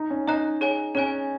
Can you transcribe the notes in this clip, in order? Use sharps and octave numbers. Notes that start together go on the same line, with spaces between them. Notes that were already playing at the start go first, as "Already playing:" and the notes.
Already playing: D#4
C#4
D#4 D#5 A#5 F#6
G#4 C#5 G#5
C#4 G#4 C#5 G#5